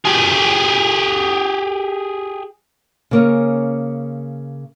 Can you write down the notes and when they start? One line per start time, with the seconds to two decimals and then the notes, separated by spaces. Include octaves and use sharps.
0.05 G4 G#4
3.11 C#3 A#3 C#4